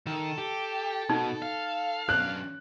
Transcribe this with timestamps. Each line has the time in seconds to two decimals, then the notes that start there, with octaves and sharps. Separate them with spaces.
0.07 D#3 A4
0.38 G4
1.10 B2 D#4
1.42 F5
2.09 F#2 D4 F#6